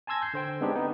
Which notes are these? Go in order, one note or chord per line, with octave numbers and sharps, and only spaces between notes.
G#5 A5 C6 E6 G#6 A#6
G6 C7
D3 C5 G5
G#3 B3 C4 D4 D#4 G4
B3 D#4